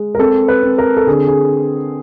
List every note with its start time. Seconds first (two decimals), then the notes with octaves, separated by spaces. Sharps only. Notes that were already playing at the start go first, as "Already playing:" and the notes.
Already playing: G#3
0.15 A#4
0.19 C4 A4
0.48 B4
0.63 C4
0.78 A#4
0.97 A4
1.07 D3 G#4
1.27 G#4